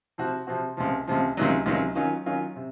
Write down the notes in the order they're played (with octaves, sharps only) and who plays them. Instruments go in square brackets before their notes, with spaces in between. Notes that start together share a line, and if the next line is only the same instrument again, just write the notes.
[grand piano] C3 F3 C4 F#4
C3 F3 C4 F#4
C#2 C3 F3
C#2 C3 F3
C#2 C3 D#3 F#3
C#2 C3 D#3 F#3
D#3 F#3 C#4 F4
D#3 F#3 C#4 F4
C3